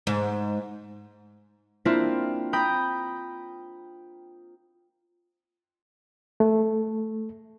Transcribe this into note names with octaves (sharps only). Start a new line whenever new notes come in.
G#2
A#3 C4 D4 E4 F4
G5 A#5 B5 D#6 G6
A3